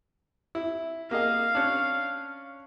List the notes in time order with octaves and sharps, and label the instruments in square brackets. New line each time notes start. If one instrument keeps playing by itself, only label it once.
[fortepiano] E4
[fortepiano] A#3 G#4 D#5 [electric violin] F5
[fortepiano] C#4 D4